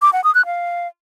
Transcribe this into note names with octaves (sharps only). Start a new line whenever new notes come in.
D6
F#5
D#6
F#6
F5